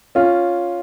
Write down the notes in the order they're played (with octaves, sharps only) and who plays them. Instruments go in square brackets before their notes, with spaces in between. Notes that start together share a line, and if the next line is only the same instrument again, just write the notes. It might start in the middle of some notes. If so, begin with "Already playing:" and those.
[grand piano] C#4 F4